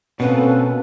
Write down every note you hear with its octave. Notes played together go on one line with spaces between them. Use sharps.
B2 A#3 C4 C#4 A4 B4